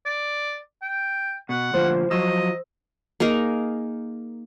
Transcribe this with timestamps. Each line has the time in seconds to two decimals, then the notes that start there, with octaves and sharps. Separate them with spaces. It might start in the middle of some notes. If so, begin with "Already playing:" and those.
0.06 D5
0.82 G5
1.49 B2 F#5
1.74 D2 A#2 F3 C5
2.11 F3 F#3 D#5 E6
3.20 A#3 D#4 G#4 A#4